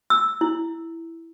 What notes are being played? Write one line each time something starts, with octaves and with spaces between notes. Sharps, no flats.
E6
E4